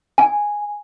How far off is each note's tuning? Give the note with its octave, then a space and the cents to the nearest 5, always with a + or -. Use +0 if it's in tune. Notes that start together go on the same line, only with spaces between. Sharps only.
G#5 -5